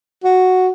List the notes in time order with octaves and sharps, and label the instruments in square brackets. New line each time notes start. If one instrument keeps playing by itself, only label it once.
[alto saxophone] F#4